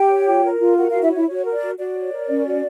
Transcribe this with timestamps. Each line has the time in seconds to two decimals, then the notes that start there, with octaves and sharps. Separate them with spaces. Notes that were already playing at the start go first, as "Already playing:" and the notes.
Already playing: G4 G5
0.10 C#5
0.27 F4
0.43 A#4
0.60 F4
0.77 F#4 A#4 F#5
0.90 F4 F#4 F5
1.02 E4 E5
1.10 C#5
1.16 E4 E5
1.27 F#4 C#5
1.45 A#4
1.52 D5
1.62 F#4
1.78 F#4 D5
1.95 C#5
2.12 A#4
2.29 C#4
2.46 F#4